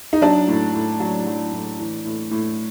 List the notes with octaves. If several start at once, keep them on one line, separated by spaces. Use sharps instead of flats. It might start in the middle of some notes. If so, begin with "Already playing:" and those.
D#4
F#3 D4
A2
A2
F#3
F#3
A2
E3
A2
A2